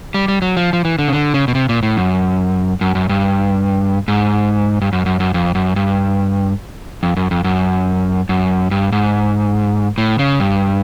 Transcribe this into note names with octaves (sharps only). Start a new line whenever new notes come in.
G3
G3
F#3
F3
F3
E3
D3
C#3
D3
C#3
B2
C3
A#2
A2
F#2
F#2
F#2
G2
G#2
G2
F#2
F#2
F#2
F2
F#2
G2
F2
F#2
F2
F#2
F#2
G2
G#2
A2
C#3
G2